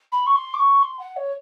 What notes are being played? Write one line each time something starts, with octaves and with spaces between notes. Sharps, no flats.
B5
C#6
C6
D6
C#6
C6
F#5
C#5